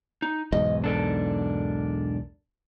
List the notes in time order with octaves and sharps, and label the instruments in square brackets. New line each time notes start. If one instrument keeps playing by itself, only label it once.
[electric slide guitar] D#4
[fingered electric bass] B1 E2 G#2 [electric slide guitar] D#5
[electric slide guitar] D4 A4 A#4